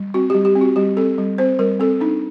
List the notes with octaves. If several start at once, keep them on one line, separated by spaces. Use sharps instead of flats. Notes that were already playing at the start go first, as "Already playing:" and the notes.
Already playing: G3
C4 F#4
G3 G4
G4
C4
F#4
G3 G4
C4 A4
G3
C4 C5
G3 A#4
C4 A4
D4 D#4